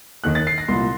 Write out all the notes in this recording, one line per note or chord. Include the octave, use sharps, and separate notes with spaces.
D#2 D#3 F#6
A6
C7
A#6
C2 A#2 C6